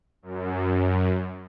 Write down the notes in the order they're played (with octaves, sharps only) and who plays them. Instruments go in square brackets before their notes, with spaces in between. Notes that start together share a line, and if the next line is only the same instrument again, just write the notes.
[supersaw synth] F#2